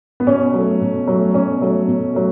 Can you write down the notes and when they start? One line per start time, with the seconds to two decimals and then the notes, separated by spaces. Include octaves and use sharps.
0.20 B3
0.27 B2 C#4
0.54 F#3 A3
0.81 B2
1.07 F#3 A3
1.34 B2 C#4
1.61 F#3 A3
1.88 B2
2.14 F#3 A3